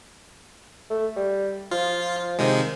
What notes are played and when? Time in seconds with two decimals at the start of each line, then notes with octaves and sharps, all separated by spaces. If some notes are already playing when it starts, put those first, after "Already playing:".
0.90 A3
1.16 G3
1.71 F3 F4
2.39 C3 D#3 F3 G#3